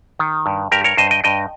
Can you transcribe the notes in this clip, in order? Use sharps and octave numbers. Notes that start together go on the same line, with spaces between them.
D#3
G2
G2 G4 A#4
A#4 C#5
G2 C5 D#5
D#5 G5
G2 D#5 G5